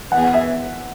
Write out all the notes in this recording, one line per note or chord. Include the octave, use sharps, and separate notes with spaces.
E3 B3 G#4 F#5
F#5
E5